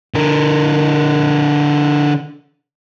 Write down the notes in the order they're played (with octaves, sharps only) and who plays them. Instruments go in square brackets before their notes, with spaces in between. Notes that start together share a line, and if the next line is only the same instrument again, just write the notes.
[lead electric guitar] D3 A#4